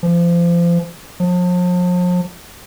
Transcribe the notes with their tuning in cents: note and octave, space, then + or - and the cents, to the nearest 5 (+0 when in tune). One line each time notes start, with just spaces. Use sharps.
F3 -30
F3 +40